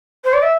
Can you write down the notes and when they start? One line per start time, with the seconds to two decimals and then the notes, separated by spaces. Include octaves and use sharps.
0.24 C5
0.33 D5
0.42 E5